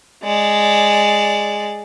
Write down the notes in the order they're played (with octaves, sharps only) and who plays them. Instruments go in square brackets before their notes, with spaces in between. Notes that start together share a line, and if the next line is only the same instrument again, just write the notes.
[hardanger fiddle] G#3 D5